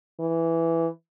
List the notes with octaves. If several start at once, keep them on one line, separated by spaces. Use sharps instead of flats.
E3